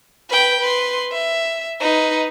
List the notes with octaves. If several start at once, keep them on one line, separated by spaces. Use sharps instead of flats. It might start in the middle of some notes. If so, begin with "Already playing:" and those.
B4 G5
B4 C6
E5
D#4 B4